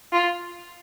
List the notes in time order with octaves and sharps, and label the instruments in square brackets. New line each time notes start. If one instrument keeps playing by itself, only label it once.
[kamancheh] F4